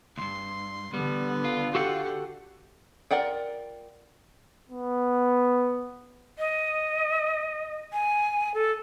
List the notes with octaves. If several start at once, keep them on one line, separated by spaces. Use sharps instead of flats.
D2 G2 C6
D3 G3 B3
F4
F#4 G4 A4 F#5
F4 A#4 D5 F#5 G5
B3
D#5
G#5
A4